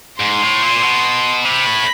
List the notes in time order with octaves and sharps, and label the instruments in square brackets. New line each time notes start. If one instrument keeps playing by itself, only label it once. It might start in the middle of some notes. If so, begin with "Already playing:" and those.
[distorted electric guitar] G#2 [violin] C6
[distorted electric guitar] A2
A#2
B2
[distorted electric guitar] C3 [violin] B5
[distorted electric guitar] A2